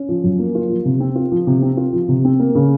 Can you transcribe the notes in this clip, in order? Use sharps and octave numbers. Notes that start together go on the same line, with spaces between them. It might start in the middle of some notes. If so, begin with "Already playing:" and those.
Already playing: C#4
F3
F#2
A#3
F4
F3
C3
C4
F4
F3
C3
C4
F4
F3
C3
C4
A#3
C#3